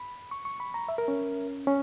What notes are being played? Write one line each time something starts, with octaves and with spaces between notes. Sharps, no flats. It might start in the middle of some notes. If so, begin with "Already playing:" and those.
Already playing: B5
C#6
C#6
B5
A#5
E5
A#4
C#4
C#4